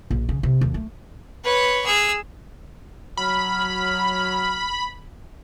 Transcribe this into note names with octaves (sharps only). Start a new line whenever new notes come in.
A#1
C#3
C3
D#2
A3
B4 C#5
G#4 E6
F#3 B5 F6